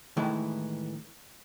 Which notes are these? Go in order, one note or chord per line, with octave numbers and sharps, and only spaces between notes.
A2 D#3 E3 G#3 E4